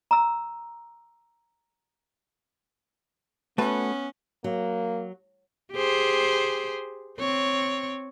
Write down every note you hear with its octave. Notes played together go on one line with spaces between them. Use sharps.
A#5 E6
A3 B3 C#4 F#4 B4
F#3 A#3
G4 G#4 C5
C4 C#5